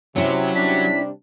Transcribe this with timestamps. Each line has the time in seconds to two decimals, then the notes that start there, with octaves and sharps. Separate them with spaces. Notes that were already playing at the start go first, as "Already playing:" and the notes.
0.16 C3 F#3 C#4 E4
0.56 C3 G3 D4 B6